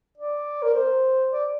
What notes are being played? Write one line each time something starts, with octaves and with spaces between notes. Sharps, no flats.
D5
A#4
C5
D5